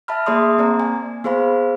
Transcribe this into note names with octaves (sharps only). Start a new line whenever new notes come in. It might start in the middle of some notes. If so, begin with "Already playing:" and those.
E5 A5 B5 F6
A#3 G#4 D5 E5 C6 D#6
A#3 C4 D5 A#5
G#5
B3 G#4 C5 F5 B5